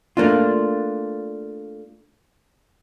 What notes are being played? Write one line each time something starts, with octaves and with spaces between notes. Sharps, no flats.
A3 A#3 D4 F4